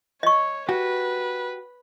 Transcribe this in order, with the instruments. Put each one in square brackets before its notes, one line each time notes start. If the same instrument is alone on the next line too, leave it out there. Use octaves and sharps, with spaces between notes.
[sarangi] C#5 [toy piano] D#5 C#6
[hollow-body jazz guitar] F#4 G4 [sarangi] B4